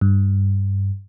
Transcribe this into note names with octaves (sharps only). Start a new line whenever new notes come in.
G2